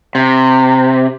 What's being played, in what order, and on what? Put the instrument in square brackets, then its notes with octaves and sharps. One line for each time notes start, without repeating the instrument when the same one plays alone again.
[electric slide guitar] C3